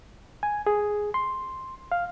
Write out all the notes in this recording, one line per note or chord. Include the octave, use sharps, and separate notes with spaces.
G#5
G#4
C6
F5